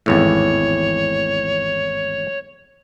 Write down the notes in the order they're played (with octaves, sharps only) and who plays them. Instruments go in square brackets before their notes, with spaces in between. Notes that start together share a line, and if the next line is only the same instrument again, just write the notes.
[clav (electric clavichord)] G#1 E2 A2 [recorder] C#5